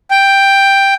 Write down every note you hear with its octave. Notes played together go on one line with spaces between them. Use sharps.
G5